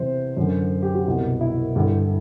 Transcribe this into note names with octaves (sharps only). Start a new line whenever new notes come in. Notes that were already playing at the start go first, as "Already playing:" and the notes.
Already playing: E2 C3 E3 C5
F#2 D3
G4
F#4
C2 B2
E4
G2 D3